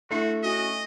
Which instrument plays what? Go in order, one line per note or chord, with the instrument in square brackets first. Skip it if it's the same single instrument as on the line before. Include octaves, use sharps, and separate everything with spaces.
[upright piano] A3 [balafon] D4 E4 E5 [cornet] F#4
[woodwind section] C#4 F#4 [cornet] D#5